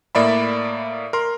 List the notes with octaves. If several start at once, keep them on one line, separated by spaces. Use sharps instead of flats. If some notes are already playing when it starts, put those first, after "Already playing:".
A2 A#3 D5 E5 B5
A#4 C6